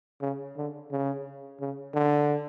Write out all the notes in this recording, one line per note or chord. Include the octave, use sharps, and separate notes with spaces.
C#3
D3
C#3
C#3
D3